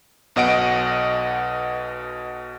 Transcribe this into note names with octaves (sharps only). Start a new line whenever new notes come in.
B1 B2 D#5 F#5 D7